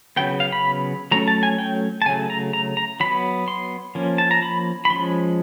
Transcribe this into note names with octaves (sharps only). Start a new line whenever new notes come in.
C#3 F#3 B3 G5
F5
B5
F#3 A3 C#4 A#5
A5
G#5
G5
A5
C#3 F#3 A3 G#5
A#5
A#5
A#5
F#3 B3 B5
C6
F3 A#3 C#4
A5
A#5
B5
B5
F3 G#3 C#4 C6